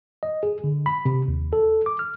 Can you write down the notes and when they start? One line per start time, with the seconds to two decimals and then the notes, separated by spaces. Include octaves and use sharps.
0.23 D#5
0.43 G#4
0.64 D3
0.86 B5
1.05 C3
1.28 D#2
1.53 A4
1.86 D6
1.99 F6